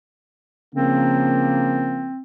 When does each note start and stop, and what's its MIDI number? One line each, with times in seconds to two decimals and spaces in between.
0.75 2.14 49
0.75 2.14 53
0.75 2.14 58
0.75 2.22 60